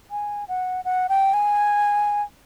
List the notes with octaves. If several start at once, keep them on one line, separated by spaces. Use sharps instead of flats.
G#5
F#5
F#5
G5
G#5